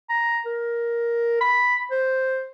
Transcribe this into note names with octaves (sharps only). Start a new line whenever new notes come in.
A#5
A#4
B5
C5